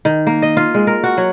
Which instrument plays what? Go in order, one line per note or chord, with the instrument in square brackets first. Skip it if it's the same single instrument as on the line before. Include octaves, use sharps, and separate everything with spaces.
[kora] D#3
A#3
D#5
F4
G#3
A#4
F#4
F#3